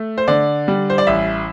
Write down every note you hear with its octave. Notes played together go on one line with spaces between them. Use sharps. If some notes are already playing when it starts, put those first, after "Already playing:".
Already playing: A3
C5
D3 D5
G3
C5
D5
A1 E5